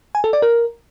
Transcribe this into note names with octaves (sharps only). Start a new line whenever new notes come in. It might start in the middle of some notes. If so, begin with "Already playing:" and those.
G#5
A4
D5
A#4